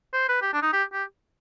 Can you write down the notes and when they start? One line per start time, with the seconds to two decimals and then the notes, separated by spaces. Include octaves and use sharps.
0.13 C5
0.29 B4
0.42 G4
0.53 D4
0.62 D#4
0.73 G4
0.93 G4